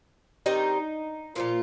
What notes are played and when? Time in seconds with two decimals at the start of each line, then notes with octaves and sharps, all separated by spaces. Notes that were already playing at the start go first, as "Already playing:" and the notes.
0.46 D#3 G3 C4 D#4
1.35 A#2 F3 A#3 F4